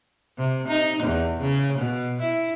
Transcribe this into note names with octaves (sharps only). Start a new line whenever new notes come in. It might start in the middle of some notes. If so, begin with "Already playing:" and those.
C3
D#4
E2
C#3
B2
E4